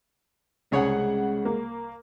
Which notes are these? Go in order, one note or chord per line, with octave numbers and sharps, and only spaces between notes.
C2 C#3 G#3 G#4 C#5 F#5
A#3